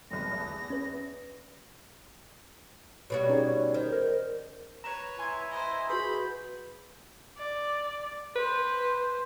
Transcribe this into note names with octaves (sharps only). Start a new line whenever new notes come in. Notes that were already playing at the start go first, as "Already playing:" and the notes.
F1 B1 A#6
E2
C#4 B4
B2 G3 F#4 C#5
C#4 D#4 G#4
D#3 C5
A#4
B4 C#5 A#5 E7
E4 G#5 C6 G#6
C5 D#5
F#4 G#4 B4 B5 C6 G6
D5
B4 C5